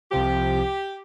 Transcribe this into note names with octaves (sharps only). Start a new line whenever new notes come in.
C2 C3 F3 G4